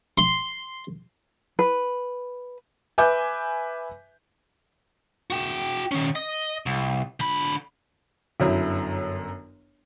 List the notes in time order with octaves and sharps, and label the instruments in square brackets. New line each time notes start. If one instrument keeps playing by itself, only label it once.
[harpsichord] C6
[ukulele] B4
[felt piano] B4 E5 G#5 D6 G6
[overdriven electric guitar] F#4 G5
D#3 C#4
D#5
C2
D3 B5
[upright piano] G1 F#2 F#3 E4